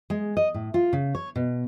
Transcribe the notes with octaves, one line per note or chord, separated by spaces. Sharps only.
G#3
D#5
A2
F4
C#3
C#5
B2